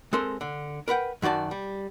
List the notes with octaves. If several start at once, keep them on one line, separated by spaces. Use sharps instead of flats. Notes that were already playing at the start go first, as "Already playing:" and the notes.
G#3 C4 A4 A#4 C5
D3
A#4 B4 F#5 G5
F#2 D#3 F#4 D5 A5
G3